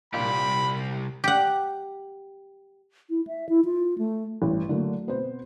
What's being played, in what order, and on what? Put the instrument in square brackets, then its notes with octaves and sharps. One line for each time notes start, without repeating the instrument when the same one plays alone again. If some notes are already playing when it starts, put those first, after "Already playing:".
[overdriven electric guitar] C2 G4 [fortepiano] A#2 [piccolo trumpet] B5
[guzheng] G4 F#5
[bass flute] E4
E5
E4
F4
A3
[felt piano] A1 G2
D3 F#3 A3 A#3
B2 B3 C4 C5